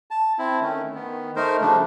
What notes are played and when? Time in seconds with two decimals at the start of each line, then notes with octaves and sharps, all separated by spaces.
0.11 A5
0.39 C4 E4
0.61 D#3 A3 C#4
0.95 D#3 B3
1.36 A3 D#4 A#4 C5
1.61 C#3 F3 G3 A3 D4